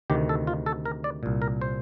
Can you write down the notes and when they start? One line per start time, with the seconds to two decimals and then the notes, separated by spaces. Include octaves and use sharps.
0.10 D2 C3 D#3 G4
0.29 A4
0.47 F4
0.66 A4
0.85 A#4
1.04 D5
1.23 C2 A#2
1.42 A#4
1.62 C5